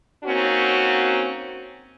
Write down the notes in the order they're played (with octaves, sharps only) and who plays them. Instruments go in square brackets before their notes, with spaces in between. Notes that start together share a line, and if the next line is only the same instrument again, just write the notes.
[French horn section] A#3 C4 C#4 D#4 F#4